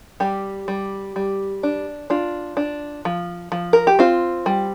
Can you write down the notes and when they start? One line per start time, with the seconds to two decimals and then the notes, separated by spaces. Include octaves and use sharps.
0.20 G3 G4
0.68 G3
1.16 G3
1.63 D4
2.10 D4 F4
2.57 D4
3.05 F3
3.52 F3
3.73 A#4
3.87 G4
3.99 C4 F4
4.46 G3